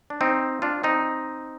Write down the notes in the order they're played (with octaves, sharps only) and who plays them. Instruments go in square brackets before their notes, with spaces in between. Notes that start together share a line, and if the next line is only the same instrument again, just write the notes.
[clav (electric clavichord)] D4
C4 D#4
D4 F4
C4 D#4